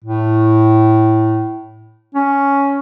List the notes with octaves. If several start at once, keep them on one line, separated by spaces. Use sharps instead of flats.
A2
C#4